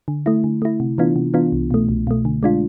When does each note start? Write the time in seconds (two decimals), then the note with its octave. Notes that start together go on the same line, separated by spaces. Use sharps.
0.08 D3
0.26 A3 E4
0.44 D3
0.62 A3 E4
0.80 C3
0.98 E3 B3 D4 F4
1.16 C3
1.34 E3 B3 D4 F4
1.52 C2
1.71 B2 A3
1.89 C2
2.07 B2 A3
2.25 D3
2.43 G#3 D4 F4